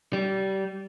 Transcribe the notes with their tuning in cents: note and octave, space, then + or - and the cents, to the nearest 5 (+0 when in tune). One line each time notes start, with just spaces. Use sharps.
G3 -25